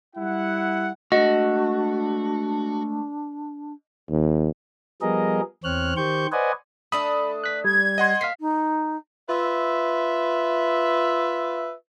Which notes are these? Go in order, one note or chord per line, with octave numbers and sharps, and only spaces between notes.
G3 E4 F#5
G#3 A3 D4 F#4 D#5
D#2
F3 G3 B3 G#4 A#4 D#5
E2 C4 C#5 F6 F#6
D#3 G4 C5 C#6 G6
B4 C5 D5 D#5 F#5 G#5
A3 D4 A4 B5 D#6
F#6 B6
G3 G#6
D#5 F#5 C6
A#3 F5 B6 C7
D#4
F4 B4 E5